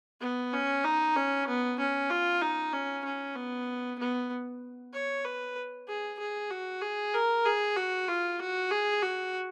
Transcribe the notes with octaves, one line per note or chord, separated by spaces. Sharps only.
B3
C#4
D#4
C#4
B3
C#4
F4
D#4
C#4
C#4
B3
B3
C#5
B4
G#4
G#4
F#4
G#4
A#4
G#4
F#4
F4
F#4
G#4
F#4